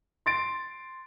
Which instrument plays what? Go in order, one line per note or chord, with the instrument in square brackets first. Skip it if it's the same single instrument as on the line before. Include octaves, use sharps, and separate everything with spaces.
[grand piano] C6 A6 D7